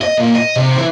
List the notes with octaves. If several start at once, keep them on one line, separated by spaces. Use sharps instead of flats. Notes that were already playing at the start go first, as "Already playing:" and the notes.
D#5
A#2
D#5
C3
E3